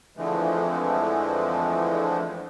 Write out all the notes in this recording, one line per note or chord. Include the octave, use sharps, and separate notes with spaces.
F2 D3 E3 F3 G#3 A3